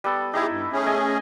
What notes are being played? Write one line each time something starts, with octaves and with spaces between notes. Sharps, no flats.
G3 B3 A4
D#4 E4 G4 G#4
G2
A3 C#4 G#4
D#5 G#5